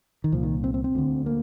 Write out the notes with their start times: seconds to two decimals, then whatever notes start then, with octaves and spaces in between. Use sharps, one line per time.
0.24 D#3
0.32 C2 A#2 F3
0.43 D#3
0.64 C4
0.74 C4
0.84 C4
0.95 D2 D3
1.26 A#3